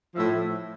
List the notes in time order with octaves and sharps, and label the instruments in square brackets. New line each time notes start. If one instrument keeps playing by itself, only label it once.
[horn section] A2 F3 E5